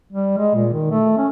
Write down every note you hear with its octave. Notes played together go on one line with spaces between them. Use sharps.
G3
G#3
A#2
D#3
A3
C#4